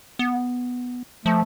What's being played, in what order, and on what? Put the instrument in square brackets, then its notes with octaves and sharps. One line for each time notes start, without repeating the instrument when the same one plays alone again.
[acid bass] B3
[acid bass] F3 [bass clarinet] A3